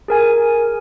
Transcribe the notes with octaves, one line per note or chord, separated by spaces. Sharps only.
G#4 A#4 G#5